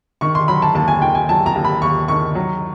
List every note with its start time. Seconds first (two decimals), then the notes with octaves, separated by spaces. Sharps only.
0.21 D#3 C#6
0.35 C6
0.48 F#3 B5
0.62 A5
0.75 D#2 A5
0.88 G#5
1.02 D#3 G5
1.15 G#5
1.29 F#3 A5
1.46 A#5
1.55 D#2
1.65 B5
1.82 D#2 C#6
2.08 D#3 C#6
2.35 F#3